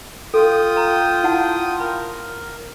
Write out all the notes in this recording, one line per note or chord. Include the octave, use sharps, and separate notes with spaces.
F4 A4 G5 D#6
A#5
E4 F#5 A5
A#4 B5